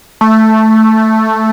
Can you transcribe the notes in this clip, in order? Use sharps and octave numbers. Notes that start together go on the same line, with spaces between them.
A3